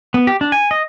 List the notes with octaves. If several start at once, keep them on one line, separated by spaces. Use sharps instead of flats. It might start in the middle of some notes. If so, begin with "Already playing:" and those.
B3
G4
D4
G#5
D#5